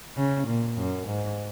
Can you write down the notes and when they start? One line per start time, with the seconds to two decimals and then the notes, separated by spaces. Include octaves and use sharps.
0.17 C#3
0.47 A#2
0.77 F#2
1.07 G#2